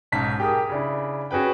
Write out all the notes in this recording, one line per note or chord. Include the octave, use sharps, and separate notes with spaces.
B1 G#2 C#4 A5 B6
G4 G#4 A#4 D#6
C#3 D4 E4
C#4 F#4 G#4 B4 G5